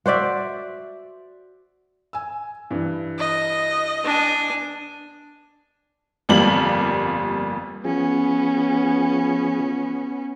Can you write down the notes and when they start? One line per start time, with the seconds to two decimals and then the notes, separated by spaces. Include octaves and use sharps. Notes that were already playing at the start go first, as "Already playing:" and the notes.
0.06 F#4 C5 D5 E5
2.13 G#5 E6
2.71 G2 E3
3.19 D#5
4.04 D4 G#5
6.29 G1 F2 G3 A#3 D6 F#7
7.85 F3 B3 C#4 G#4